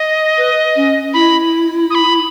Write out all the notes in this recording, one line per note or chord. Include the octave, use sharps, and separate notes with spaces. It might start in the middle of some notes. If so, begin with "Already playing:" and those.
Already playing: D#5
B4
C#4
E4 B5
D#6
B5